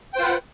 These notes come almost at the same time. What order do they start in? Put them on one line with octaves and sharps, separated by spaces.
G5 C5 F4 B4 F#5